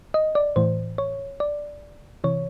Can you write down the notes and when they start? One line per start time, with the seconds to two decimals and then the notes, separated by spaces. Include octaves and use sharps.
0.14 D#5
0.35 D5
0.56 A2 E3 C5
0.98 C#5
1.40 D5
2.24 C3 E3 C#5